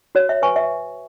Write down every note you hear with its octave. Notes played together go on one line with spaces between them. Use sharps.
F#4 C#5
E5
B4 G#5 C#6
E5